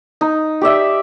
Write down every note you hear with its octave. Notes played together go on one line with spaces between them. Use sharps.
D#4
G4 D5 E5